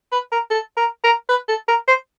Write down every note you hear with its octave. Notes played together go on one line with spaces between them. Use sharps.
B4
A#4
A4
A#4
A#4
B4
A4
A#4
C5